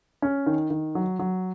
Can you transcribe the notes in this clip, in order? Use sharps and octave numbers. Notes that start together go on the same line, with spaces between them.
C#4
D#3
D#3
F#3
F#3